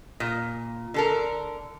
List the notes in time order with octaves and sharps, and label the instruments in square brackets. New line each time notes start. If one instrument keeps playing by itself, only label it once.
[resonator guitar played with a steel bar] A#2
D3 A4 A#4